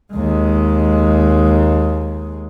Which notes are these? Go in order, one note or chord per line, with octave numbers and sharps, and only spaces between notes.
D#2 G#3